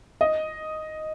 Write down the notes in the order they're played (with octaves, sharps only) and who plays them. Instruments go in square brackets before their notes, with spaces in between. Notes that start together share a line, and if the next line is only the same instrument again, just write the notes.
[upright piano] D#5